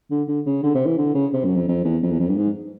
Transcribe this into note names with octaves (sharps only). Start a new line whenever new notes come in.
D3
D3
C#3
D3
C3
E3
D3
C#3
C3
F#2
F2
F2
E2
F2
E2
F2
G2
G#2